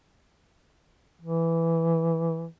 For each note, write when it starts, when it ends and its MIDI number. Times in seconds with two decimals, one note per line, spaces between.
1.21 2.46 52